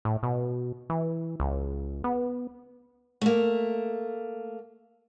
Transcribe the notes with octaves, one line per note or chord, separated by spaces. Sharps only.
A2
B2
E3
C#2
B3
A3 A#3